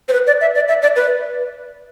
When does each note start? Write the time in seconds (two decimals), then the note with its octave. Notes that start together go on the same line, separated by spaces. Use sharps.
0.09 C5
0.13 B4
0.27 D5
0.41 E5
0.55 D5
0.68 E5
0.82 D5
0.96 B4